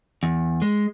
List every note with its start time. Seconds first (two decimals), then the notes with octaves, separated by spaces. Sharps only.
0.23 E2
0.62 G#3